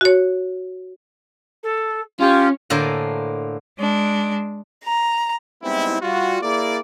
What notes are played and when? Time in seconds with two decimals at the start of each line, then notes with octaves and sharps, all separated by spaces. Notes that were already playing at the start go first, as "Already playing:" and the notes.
0.01 F#4 C#5
1.63 A4
2.20 C#4 F4 G4
2.70 A2 D3 A#3 C5 G#5 A5
3.79 G#3 D4
4.85 A#5
5.63 G3 G#3 B3 C4 D#4 E4
6.01 G3 F4 F#4
6.42 A#3 E4 G#4 D5